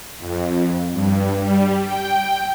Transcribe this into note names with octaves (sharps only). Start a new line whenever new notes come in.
F2
G2
G3
G5